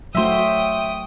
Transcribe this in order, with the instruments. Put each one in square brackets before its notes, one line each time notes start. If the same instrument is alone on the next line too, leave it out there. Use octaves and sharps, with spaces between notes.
[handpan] F#3 A3 F#4 [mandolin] C5 E5 [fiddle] G5 D#6